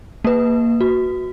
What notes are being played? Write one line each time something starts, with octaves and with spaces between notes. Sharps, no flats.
A#3 B4
F#4